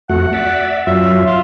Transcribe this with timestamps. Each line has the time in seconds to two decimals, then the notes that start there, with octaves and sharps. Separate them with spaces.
0.10 F2 A3 F#4 F#5
0.33 D5 E5
0.87 F#2 F#3 F4 E5
1.27 F4